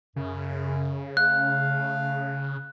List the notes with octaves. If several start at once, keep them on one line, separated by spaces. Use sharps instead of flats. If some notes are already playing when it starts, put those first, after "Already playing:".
F#2 C#3
A3 F5 F#6